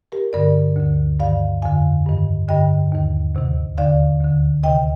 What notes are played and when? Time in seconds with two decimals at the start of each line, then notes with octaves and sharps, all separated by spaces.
0.12 G4 A#4
0.33 G2 D3 A#4 D5
0.76 D2 D3
1.20 G2 D#3 D5 F5
1.62 F2 D3 F5 G#5
2.06 G2 D#3
2.49 G2 D3 D#5 G5
2.92 D#2 D#3
3.35 D2 C3 D#3
3.78 D#2 D3 D5 F5
4.21 D2 D3
4.63 D2 C3 D#3 D#5 G5